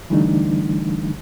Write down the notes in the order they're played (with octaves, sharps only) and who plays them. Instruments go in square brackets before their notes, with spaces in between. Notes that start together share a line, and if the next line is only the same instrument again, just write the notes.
[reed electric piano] D3 E3 G3 A3 D4 D#4